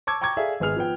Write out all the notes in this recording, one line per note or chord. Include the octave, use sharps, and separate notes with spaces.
A5 C#6 D6 E6 G#6
G5 A#5 C#6 D6 G#6
G#4 A4 D5 E5 F5
G#1 B3 G#4 F6 F7
F3 B3 G5